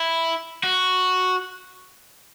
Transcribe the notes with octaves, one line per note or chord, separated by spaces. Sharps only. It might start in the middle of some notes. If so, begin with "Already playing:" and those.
Already playing: E4
F#4